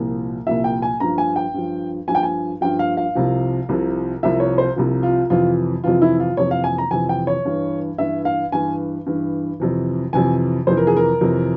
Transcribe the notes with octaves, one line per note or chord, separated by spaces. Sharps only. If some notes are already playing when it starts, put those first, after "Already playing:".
Already playing: C2 A#2 F3
C2 A#2 F3 E5
G5
G#5
G2 F3 A#5
G#5
G5
G2 F3
G2 F3 G#5
G5
G#5
G2 F3 G5
F5
F5
C2 C3 F3
C2 C3 F3
C2 C3 F3 E5
C#5
C5
C2 C3 F3
F4
F2 C3 E3 F4
F2 C3 E3 F4
E4
F4
F2 C3 E3 C#5
F5
G#5
A#5
F2 C3 E3 G#5
G5
C#5
G2 E3
G2 E3 E5
F5
G2 E3 G#5
G2 E3
F2 C3 E3
F2 C3 E3 G#5
F2 C3 E3 C5
A#4
G#4
A#4
F2 C3 E3